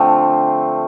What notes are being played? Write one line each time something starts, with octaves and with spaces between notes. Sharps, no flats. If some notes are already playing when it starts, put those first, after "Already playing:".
Already playing: D3 F3 A3 C4